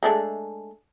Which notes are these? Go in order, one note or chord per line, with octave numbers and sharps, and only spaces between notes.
G#3 A3 D4